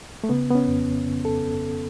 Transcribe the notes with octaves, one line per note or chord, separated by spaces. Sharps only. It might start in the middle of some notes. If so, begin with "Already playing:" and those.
A3
C#3 B3
B3
C#4
F2
C#3
A4